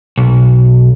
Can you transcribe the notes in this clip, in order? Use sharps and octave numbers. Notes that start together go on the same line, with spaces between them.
B1